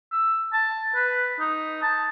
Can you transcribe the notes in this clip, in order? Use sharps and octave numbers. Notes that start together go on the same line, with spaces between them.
E6
A5
B4
D#4
A5